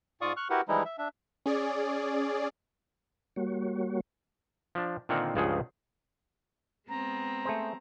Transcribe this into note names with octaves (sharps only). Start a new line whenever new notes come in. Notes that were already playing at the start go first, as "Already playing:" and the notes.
G#2 F4 D5 F5 C#6 D#6
C#6 F6 F#6
E4 F#4 G4 A#4 B4 F#5
E3 F3 G3 G#3 D#4 E4
E5
D4 E5
C#4 G#4 D5
G3 A#3 F#4 C#5
F3 D4
A#2 D3 D#3 A#3 C4 F#5
C#2 G2 C#3 F3 G#4 F#5
G#3 B3 C4 A#5
A3 G#4 C5